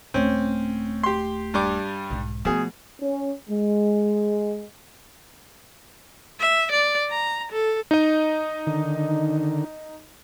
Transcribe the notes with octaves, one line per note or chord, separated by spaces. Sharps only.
D#1 A3 C4 C#4
G4 C6
G2 G3 D6
B1 G#2
B2 F3 A3 G#4
C#4
G#3
E5
D5
A#5
A4
D#4 D#5
D3 D#3